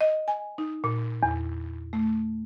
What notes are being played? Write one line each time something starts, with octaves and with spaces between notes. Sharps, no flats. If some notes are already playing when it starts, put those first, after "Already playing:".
D#5
G#5
D#4
A#2
E2
A3